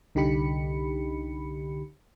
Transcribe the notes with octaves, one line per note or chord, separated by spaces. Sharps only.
C2 D3 D#4 G4 B5 C#7